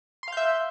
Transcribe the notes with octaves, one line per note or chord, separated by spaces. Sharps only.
E5 F5 C6 G6